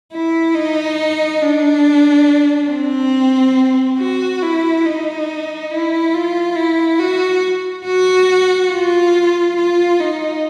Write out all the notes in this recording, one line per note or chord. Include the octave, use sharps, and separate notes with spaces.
E4
D#4
D4
C4
F#4
E4
D#4
E4
F4
E4
F#4
F#4
F4
F4
D#4